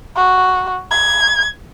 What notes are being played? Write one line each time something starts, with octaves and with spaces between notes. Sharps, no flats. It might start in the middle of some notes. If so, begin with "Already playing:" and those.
F#4
G#6